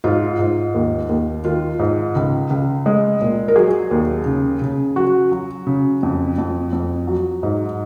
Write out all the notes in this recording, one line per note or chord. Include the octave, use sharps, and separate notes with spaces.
G#2 F4
G#2
D#2
D#2
D#3 F4
G#2
C#2
C#2
G#3
A#2
A#4
F#3 G#4
D#2
C#3
C#3
F#3 F#4
F#3
C#3
F2
F2
F2
F#3
G#2